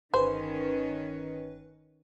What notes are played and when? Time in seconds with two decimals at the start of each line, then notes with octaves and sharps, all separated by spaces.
0.14 G1 D#3 C#4 G#4 B4 C5